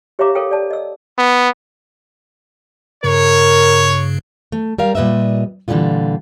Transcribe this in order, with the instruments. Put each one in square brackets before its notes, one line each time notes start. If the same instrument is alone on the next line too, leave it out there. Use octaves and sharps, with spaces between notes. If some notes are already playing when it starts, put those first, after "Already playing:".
[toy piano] G4 C#5 E5 F5 A#5 D6
A4 A#4 C#5 F5 G5
D5 A5
D#5 E6
[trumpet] B3
[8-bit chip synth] G2 C#3 [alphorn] A#4 [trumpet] C#5
[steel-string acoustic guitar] A3
G3 A#4 F5
A#2 G3 B4 D#5 E5
A#2 D3 E3 G3 G#3 F4